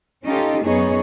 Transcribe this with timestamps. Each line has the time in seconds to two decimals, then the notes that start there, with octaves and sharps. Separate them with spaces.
0.24 C#4 D#4 F4 G4 A4
0.64 F#2 B3 D#4 G#4 C#5